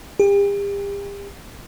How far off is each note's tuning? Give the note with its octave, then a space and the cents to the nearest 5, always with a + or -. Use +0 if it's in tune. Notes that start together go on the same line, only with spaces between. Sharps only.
G4 +40